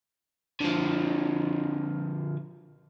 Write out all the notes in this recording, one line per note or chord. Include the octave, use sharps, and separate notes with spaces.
D3 F3